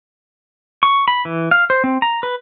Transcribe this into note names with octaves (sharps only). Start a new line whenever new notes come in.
C#6
B5
E3
F5
C5
C4
A#5
B4